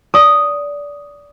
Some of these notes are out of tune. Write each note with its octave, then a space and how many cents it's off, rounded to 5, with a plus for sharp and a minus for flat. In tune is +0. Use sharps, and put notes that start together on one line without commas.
D5 -20 D#6 +0